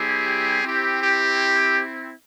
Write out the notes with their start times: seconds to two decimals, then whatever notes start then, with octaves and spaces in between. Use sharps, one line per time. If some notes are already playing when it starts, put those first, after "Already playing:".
Already playing: G3 C4 E4 G4 G#4
0.63 C4 E4 G4
1.01 G4